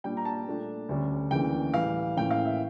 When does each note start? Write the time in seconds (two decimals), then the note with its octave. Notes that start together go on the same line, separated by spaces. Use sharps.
0.04 A#2 G3 D4 G5
0.17 A#5
0.25 A5
0.47 A#2 A3 D4
0.89 D2 D3 G3 C#4
1.31 D2 C#3 E3 A#3 D4 G5
1.74 A2 E3 G3 F5
2.15 A2 E3 A#3 C#4 G5
2.31 F5
2.45 E5